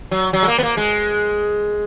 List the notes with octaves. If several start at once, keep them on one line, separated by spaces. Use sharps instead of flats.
F#3
F#3
G#3
A#3
B3
A#3
G#3